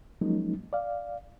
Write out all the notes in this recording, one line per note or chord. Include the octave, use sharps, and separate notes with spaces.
F3 F#3 G#3 A#3 C#4 D#4
D5 F5